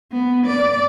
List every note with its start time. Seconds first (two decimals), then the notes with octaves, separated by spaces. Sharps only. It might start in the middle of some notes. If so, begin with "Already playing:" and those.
0.12 B3
0.46 D5